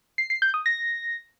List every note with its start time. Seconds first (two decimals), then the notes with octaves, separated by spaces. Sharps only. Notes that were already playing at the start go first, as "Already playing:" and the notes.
0.18 C7
0.30 C7
0.42 G6
0.54 D#6
0.66 A#6